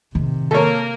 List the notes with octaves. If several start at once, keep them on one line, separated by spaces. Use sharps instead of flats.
A2 C3 D#3
A#3 A4 A#4 C#5